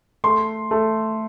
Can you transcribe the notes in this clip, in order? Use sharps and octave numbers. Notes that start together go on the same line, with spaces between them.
A3 C6
A3